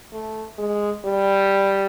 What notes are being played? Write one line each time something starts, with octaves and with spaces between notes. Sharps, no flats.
A3
G#3
G3